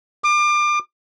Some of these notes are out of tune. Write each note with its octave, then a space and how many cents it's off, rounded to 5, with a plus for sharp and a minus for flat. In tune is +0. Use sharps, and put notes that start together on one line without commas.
D6 +30